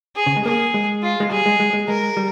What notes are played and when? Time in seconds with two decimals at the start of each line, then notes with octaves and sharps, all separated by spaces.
0.16 G#4
0.26 C#3
0.36 G#3
0.46 A#3 G#4
0.74 G#3
1.03 F4
1.20 G#3
1.31 G3 G#4
1.46 G#3
1.60 G#3
1.73 G#3
1.88 G#3 A#4
2.17 G3